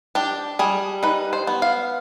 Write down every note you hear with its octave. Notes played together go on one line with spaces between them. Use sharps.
D4 G4
G3 G#4
D#4 B4
C5
B3
F5